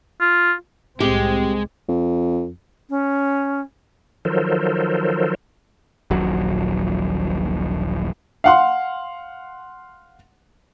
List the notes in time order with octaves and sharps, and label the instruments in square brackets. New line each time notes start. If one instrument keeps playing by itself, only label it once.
[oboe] F4
[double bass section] C2 A2 C4 [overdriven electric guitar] G#3 [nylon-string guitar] G4
[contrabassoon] F2
[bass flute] C#4
[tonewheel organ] D#3 F3 F#3 A4 A#4 C5
[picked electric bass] D#1 A#1 F#3
[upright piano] F5 F#5 C6